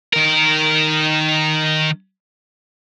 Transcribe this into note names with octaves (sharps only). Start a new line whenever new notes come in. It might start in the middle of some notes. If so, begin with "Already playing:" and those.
D#3 A#4